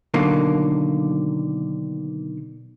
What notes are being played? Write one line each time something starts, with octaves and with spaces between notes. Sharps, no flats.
B2 D3 D#3 F#3 A#3